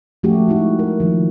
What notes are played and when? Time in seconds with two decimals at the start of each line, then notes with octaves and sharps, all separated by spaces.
0.23 F3 A3 C#4 F#4 G4
0.48 G#3 D#4 E4 F#4
0.79 A#4
1.00 D#3 F3